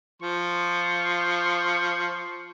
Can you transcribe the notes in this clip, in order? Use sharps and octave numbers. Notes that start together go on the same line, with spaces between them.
F3 C6 C#6